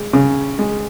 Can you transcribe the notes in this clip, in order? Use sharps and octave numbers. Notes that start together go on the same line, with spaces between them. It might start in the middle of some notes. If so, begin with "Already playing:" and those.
Already playing: G#3
C#3
G#3